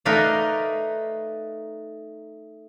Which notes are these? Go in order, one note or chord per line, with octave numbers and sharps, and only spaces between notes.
A3 D#4 A#4 B4 D5 F5